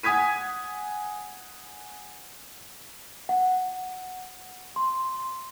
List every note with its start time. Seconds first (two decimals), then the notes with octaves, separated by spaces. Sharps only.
0.03 F#5 G#5 D#6 G#6 B6 D#7
3.29 F#5
4.76 C6